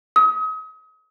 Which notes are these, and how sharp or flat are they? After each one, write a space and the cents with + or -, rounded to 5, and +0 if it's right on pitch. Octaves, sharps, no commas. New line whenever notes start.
D#6 +35